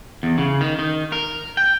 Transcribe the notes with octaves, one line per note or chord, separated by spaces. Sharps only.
E2
C#3
D#3
D#3
A#4
G5